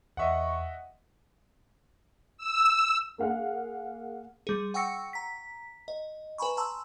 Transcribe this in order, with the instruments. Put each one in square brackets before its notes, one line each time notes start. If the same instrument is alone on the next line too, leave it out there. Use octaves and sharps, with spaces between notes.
[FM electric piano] E2 C#6 [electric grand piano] D#5 E5 F#5
[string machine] E6
[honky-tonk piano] A#3 G#4 F5 F#5
[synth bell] G3 G#4
F#5 G5 C#6 E6 A#6 C#7
A#5 B6
D#5
B4 G#5 A#5 B5 C#6
A5 A#5 C6 E6